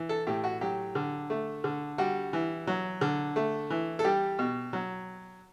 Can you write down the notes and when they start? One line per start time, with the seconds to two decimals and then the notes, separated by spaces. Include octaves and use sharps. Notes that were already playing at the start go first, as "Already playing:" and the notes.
Already playing: E3
0.09 A4
0.27 A2 G4
0.44 F#4
0.61 F#3 G4
0.95 D3
1.30 A3
1.64 D3
1.98 G3 F#4
2.33 E3
2.67 F#3
3.01 D3
3.36 A3
3.70 E3
3.99 A4
4.04 G3 G4
4.39 B2
4.73 F#3